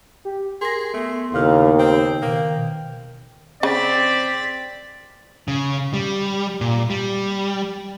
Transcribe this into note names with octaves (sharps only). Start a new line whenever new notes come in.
G4
G#4 A#4 C6 A#6
A3 B3
D#2 A2 C#3 F5
C4 G5
B2 D#3 A#3
C#3 C4 D5 A6 B6
C#3
G3
A#2
G3